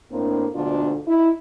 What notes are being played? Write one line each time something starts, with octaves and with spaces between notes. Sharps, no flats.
A2 A#3 C4 D4
D2 G#2 B2 D3 D4 F4
D#4 E4